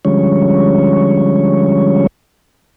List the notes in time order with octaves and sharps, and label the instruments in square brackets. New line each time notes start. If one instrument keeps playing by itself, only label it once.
[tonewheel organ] D3 F3 G3 G#3 C#4 C#5